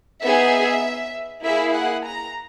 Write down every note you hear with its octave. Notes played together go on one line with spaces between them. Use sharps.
B3 D#4 G#4 E5
A#3 E4 G#4 E5
F#5
A#5